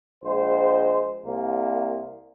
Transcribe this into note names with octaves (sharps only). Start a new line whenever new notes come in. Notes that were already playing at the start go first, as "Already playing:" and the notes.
A#1 G#3 C5
C2 A#3